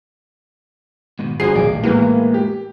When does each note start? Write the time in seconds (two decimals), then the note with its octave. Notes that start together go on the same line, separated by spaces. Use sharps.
1.19 G#2 B2 D#3
1.40 G1 G3 F#4 G#4 C5 C7
1.55 D#1 B1 A2 A#4 D5
1.84 A2 E3 G#3 A#3 B3
2.34 G4